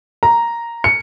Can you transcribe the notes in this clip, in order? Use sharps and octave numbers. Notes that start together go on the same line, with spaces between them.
A#5
C#7